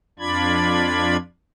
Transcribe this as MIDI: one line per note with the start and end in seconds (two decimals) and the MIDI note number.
0.19 1.17 41
0.19 1.17 62
0.19 1.17 65
0.19 1.17 74
0.19 1.17 83
0.19 1.17 92